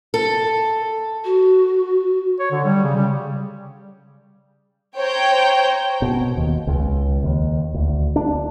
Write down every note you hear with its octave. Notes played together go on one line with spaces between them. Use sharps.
A4
F#4
C#5
D3
G3
C#3
G3
C5 C#5 G5 A#5
B2
D#2
C#2
D#2
D2
D4